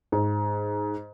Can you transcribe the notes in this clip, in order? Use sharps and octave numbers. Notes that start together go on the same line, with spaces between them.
G#2